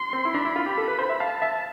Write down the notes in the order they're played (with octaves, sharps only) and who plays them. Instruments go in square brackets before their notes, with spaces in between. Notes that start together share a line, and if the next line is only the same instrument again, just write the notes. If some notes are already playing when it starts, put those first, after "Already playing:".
Already playing: [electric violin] C6
[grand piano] C4
E4
[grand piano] D4 [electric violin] B5
[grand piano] E4
F4
G4
A4
B4
C5
E5
[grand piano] F5 [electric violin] A5
[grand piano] E5